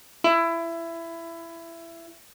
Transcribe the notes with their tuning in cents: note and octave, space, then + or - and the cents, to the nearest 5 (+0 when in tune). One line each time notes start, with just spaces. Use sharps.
E4 +20